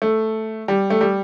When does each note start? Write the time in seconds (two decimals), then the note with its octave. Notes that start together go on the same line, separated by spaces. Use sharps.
0.02 A3
0.68 G3
0.90 A3
1.01 G3